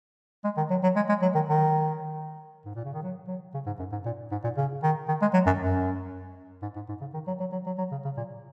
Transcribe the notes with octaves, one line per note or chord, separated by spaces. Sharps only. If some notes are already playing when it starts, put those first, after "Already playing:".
G#3
D#3
F#3
F#3
G#3
G#3
F#3
D#3
D#3
G#2
A#2
C#3
D#3
F#3
F#3
C#3
G#2
F#2
G#2
A#2
G#2
A#2
C#3
D#3
D#3
G#3
F#3
F#2
F#2
G#2
G#2
G#2
C#3
D#3
F#3
F#3
F#3
F#3
F#3
C#3
C#3
A#2